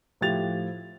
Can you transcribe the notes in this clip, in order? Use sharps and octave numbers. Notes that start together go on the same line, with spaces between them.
A2 F3 G4 A6 F7